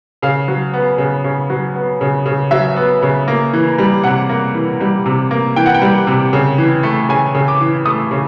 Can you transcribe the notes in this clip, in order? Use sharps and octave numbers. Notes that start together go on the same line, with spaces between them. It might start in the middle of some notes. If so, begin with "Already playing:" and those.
C#3 F5
F#3
B3
C#3
C#3
F#3
B3
C#3
C#3
F#3 E5
B3
C#3
A#3
E3
G3
C3 F#5
A#3
E3
G3
C3
A#3
E3 G5
F#5
G5
G3
C3
C#3
E3
A3
C#3 G#5
C#3
D6
E3
A3 D#6
C#3